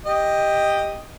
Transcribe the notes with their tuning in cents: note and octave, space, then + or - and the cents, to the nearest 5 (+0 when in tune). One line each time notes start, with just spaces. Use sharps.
G4 +10 D#5 +0